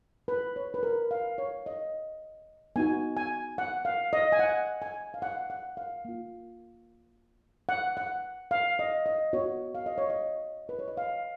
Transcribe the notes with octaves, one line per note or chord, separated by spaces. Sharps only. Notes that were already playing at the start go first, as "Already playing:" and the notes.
B4
C#5
B4
A#4
F5
C#5
D#5
B3 D#4 F#4 G#5
G#5
F#5
F5
D#5
G#5
F#5
G#5
F5
F#5
F#5
F5
A#3 F4
F#5
F#5
F5
D#5
D#5
B3 F#4 C#5
F5
D#5
C#5
D#5
B4
C#5
D#5
F5